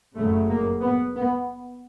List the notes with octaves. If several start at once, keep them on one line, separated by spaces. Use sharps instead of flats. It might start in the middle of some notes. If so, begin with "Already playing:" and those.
F#1 F#2 C#3 A3
A#3
B3
B3